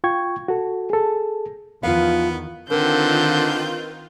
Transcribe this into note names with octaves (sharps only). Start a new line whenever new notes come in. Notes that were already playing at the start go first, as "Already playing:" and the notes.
F4 G5 C#6 G#6
F#4 A4
G#4 A4
E2 D#3 F3 B3 F4 B4 F5
D3 D#3 C4 F4 A#4 B4 G5 G6